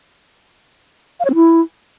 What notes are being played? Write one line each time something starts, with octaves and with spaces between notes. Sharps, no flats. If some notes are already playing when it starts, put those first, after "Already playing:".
F5
C#5
C4
E4